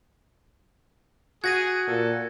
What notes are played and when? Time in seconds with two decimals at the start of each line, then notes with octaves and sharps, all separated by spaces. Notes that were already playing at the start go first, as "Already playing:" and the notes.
1.44 F#4 G#4 G#6 A#6 D#7
1.87 A#2 A4